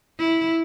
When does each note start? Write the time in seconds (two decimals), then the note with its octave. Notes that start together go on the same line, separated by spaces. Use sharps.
0.19 E4